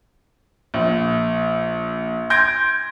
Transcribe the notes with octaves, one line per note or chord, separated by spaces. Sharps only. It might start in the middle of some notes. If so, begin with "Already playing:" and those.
A#1
C6 G6 G#6 A#6 D7